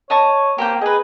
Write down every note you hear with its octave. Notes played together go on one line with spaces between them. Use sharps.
C#5 D#5 A5 C#6
A#3 G4 C5 G5
G#4 B4 D#5